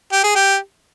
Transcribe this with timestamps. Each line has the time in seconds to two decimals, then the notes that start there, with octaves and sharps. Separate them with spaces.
0.12 G4
0.24 G#4
0.35 G4